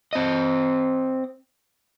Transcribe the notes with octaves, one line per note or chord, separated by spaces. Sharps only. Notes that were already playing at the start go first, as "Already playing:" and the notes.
C4 D#5